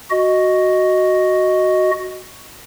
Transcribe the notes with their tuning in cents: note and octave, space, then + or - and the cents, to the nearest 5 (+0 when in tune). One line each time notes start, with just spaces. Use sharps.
F#4 +0 D#5 +0